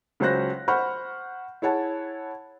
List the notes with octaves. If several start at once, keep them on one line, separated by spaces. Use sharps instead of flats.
C#2 F#3 C#4 C5 F#6 A#6
C5 F#5 B5 C#6 F6 G6
E4 G#4 C#5 F#5 A5